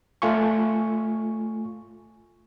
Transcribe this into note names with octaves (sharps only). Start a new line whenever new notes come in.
A3 F4 G#5 C#6